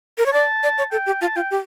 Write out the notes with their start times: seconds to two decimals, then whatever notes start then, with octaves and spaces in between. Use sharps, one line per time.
0.18 A#4
0.26 C#5
0.33 D5 A5
0.63 D5
0.78 C#5
0.92 A4 G5
1.06 G4
1.21 F4 A5
1.36 F4 G5
1.51 G4